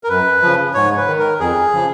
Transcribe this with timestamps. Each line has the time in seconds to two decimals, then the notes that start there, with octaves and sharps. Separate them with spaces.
0.04 A#4
0.09 F#2 B4
0.42 C#3 F3
0.74 G#2 C#5
0.97 B4
1.08 D#3
1.19 A#4
1.40 F2 G#4
1.73 C#3 F3